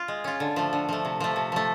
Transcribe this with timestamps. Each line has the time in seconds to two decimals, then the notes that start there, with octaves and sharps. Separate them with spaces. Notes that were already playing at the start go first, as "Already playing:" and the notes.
Already playing: F4
0.08 G#3
0.24 C#4 F4
0.40 D3
0.56 F3 A3
0.73 D3
0.89 F3 A3
1.05 C3
1.20 F3 A3
1.36 C3
1.52 F3 A3